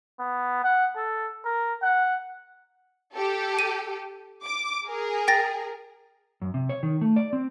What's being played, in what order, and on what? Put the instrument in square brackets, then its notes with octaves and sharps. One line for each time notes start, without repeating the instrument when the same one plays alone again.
[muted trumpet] B3
F#5
A4
A#4
F#5
[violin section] G4 A4
[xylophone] D#7
[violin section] D6
G#4 A#4
[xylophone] G5 A6 A#6
[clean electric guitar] F#2
C3
C#5
D#3
A3
D5
C4